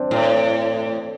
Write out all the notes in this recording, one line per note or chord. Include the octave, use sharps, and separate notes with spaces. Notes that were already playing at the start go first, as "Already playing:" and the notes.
Already playing: C4 D4
A2